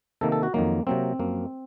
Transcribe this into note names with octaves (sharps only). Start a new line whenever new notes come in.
C3 D#3 A#3 A4
A4
F#4
F2 D#3 F#3 A#3
C3 F#3 A#3 C4
F#2 F3 A#3